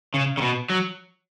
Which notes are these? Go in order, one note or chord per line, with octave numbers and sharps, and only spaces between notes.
C#3
C#3
B2
F#3